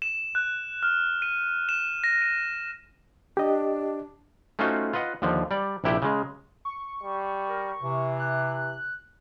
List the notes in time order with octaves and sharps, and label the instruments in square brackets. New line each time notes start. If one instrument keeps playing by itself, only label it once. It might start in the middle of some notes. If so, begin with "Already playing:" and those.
[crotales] E7
F#6
F6
D#7
E7
A#6
D#7
[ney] D4 [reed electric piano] G4 D#5
[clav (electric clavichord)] A3 C#4 D#4 F4 F#4 C5
F4 B4 D#5 F#5
D#2 D3 F3
G3 D5
A#1 C3 E4 G4 G5
C#3 G#3
[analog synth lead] C#6
[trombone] G3
[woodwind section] A#4
[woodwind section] C3 [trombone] E3
[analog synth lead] F#6